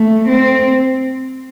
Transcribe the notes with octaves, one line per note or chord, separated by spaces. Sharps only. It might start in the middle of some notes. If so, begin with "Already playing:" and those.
Already playing: A3
C4